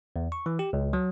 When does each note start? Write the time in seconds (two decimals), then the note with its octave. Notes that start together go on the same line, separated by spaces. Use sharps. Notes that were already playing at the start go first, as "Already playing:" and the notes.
0.16 E2
0.32 C#6
0.46 E3
0.59 G4
0.73 C#2
0.93 F#3